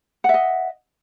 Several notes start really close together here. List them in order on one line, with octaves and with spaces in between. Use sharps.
F#5 E5 D#5